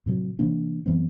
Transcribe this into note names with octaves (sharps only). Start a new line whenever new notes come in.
A2 C3 F#3
C3 E3 A#3 D4
F#2 E3 B3 C4